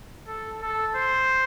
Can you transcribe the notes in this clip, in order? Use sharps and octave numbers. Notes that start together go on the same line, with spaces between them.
A4
A4
C5